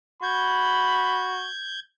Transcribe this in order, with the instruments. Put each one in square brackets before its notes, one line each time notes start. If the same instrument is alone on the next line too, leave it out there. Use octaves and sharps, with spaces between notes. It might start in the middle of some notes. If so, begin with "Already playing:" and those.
[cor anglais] F#4 [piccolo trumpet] B5 [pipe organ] G6 G#6